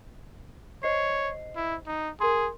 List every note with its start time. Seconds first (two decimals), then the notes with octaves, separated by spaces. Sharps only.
0.83 C5 C#5 D#5 C7
1.56 E4
1.87 D#4
2.20 G#4 A#4 C6